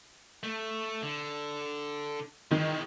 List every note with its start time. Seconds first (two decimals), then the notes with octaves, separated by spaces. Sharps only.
0.43 A3
1.03 D3
2.51 D#3 E3 G#3